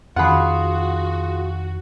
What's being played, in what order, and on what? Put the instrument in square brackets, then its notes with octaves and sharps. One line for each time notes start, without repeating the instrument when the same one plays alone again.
[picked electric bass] F2 D#3 [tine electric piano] F4 G#4 [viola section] F#4 [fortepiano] F#5 B5